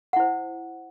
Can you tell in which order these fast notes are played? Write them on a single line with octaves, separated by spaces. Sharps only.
F#5 E4 C5